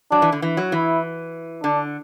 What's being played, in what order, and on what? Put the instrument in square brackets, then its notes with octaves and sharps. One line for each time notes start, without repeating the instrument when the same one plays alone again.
[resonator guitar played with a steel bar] F#3 [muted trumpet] D4
[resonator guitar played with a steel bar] E3
D3
E3
F#3
[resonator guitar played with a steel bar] E3 [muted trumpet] E4
[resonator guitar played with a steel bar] D3 [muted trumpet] D4